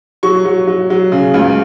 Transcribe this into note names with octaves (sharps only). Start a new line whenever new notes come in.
F#3 C#6
F#3
F#3
F#3
C#3
C#2